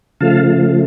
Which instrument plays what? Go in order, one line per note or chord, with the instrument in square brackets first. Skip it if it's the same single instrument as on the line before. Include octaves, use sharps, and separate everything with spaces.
[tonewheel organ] C#3 F3 A3 F5 A5